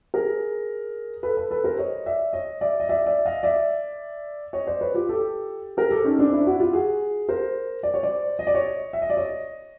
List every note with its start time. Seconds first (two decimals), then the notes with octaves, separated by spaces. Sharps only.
0.14 G#4 A#4
1.23 A4 B4
1.37 A4 B4
1.51 A4 B4
1.64 A#4 C5
1.78 C#5 D#5
2.06 D5 E5
2.33 C#5 D#5
2.61 D5 E5
2.80 D#5
2.89 D5 E5
3.06 D5 E5
3.25 D#5 F5
3.43 D5 E5
4.53 C#5 D#5
4.67 C5 D5
4.81 B4 C#5
4.94 F4 G4
5.09 G4 A4
5.77 G#4 A#4
5.91 G4 A4
6.04 C#4 D#4
6.19 C4 D4
6.33 D4 E4
6.47 E4 F#4
6.60 F4 G4
6.73 F#4 G#4
7.29 A#4 C5
7.83 D5
7.94 C#5
8.03 C5 D5
8.39 D#5
8.47 D5
8.54 C#5 D#5
8.93 E5
9.02 D#5
9.10 D5
9.17 C#5 D#5